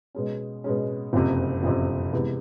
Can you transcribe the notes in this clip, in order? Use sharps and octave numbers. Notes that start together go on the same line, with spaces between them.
B2 G#3 C#4
B2 G#3 C#4
F#1 F2 C3
F#1 F2 C3
C3 E3 G#3 B3